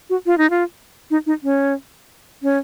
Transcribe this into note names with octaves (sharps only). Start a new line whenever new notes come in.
F#4
F4
D#4
F4
D#4
D#4
C#4
C#4